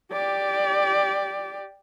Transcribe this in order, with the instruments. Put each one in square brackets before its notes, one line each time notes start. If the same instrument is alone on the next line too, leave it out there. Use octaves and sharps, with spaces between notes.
[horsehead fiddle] G4 D5